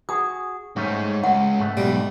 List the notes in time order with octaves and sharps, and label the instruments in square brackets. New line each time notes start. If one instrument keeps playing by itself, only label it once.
[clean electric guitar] F#4 G#4 [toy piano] D#6
[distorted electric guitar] G#2 [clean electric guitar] G3 A3 C#4
[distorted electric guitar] C#2 [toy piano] F#5
[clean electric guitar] G#2 A3
[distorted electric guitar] B1 [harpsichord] G3